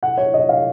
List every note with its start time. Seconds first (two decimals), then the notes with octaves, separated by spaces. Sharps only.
0.03 F#5
0.18 C#5
0.34 D#5
0.49 F5